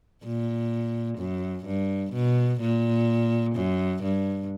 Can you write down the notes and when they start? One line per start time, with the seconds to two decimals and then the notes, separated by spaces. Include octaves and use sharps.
0.25 A#2
1.19 F#2
1.67 G2
2.13 B2
2.61 A#2
3.56 F#2
4.03 G2